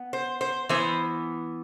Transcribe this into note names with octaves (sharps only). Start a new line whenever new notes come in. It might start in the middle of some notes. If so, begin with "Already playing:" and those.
Already playing: B3
C5
C5
E3 B3 C5